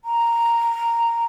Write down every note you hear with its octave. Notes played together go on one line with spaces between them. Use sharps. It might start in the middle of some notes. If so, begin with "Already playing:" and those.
A#5